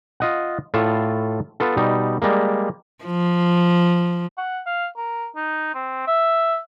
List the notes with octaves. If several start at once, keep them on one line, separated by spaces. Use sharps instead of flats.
F4 D#5 F#5
A2 F4 A4 F5 A5
B3 F4 A4
B2 G3 D#4
G3 G#3 A#3
F3
F#5
F5
A#4
D#4
C4
E5